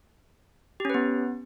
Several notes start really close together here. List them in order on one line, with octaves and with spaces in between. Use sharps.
G4 C#4 B4 B3